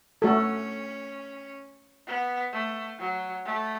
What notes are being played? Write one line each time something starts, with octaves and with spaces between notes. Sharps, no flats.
A3 C#4 F#4 A4
B3
A3
F#3
A3